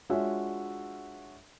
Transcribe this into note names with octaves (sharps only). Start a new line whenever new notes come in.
G#3 D4 F4 F#4 C#5 E5